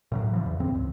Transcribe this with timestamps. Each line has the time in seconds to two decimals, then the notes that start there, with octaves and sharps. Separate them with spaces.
0.12 A2 C#3 F#3
0.33 E3 F3
0.46 E2
0.60 G2 C#3 C4
0.75 C#2